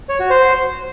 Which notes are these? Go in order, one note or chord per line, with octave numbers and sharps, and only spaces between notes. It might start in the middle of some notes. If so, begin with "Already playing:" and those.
C#5
F#4
C5